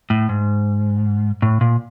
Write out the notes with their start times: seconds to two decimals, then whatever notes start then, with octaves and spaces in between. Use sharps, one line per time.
0.10 A2
0.29 G#2
1.42 A2
1.61 A#2